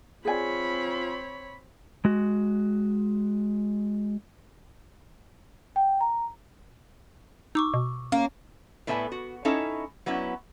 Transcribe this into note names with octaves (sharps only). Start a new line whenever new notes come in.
C4 F4 G#4 C#5 D5 G#5 B5
G#3 F#4
G5
A#5
D#4 C#6 D6 E6
B2
A#3 C#4
A2 B3 A4 B4 E5 G#5
F#4
C#4 D#4 E4 A4 E5
F#3 B3 C#4 E4